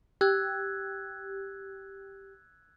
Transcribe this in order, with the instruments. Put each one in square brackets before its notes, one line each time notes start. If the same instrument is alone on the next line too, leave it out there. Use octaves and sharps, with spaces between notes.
[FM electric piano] G4 [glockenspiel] E6 F#6 G#6